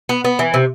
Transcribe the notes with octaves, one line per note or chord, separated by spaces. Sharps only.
B3
B3
E3
C3